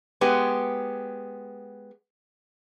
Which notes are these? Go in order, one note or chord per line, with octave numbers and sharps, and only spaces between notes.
G#3 B3 G4